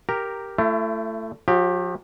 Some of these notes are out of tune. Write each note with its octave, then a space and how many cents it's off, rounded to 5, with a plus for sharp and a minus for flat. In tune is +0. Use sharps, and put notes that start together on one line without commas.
G4 +0 A#4 +0 A#5 -5
A3 +10 E4 +45
F3 +45 G4 +5